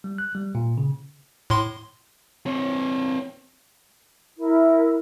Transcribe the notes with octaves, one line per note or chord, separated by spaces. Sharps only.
G3
F#6
G3
A#2
C#3
A2 C6
C4 C#5
E4 A#4